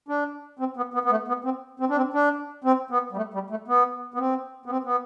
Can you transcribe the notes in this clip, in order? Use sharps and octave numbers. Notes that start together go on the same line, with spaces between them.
D4
C4
B3
B3
B3
A3
B3
C4
C4
D4
C4
D4
C4
B3
G3
A3
G3
A3
B3
B3
C4
B3
C4
B3